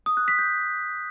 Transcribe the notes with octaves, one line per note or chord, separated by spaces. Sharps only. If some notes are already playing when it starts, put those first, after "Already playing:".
D#6
F#6
B6
G6